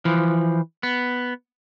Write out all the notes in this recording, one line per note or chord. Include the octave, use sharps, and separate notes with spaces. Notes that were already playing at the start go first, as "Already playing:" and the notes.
E3 F3
B3